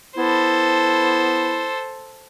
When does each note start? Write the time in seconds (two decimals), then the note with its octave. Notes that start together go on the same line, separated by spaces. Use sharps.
0.17 B3 E4 A4 C5